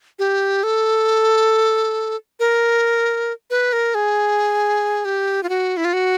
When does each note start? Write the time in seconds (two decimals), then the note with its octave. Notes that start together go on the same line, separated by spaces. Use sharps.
0.19 G4
0.63 A4
2.40 A#4
3.50 B4
3.73 A#4
3.95 G#4
5.05 G4
5.43 F4
5.49 F#4
5.77 E4
5.85 F4
5.93 F#4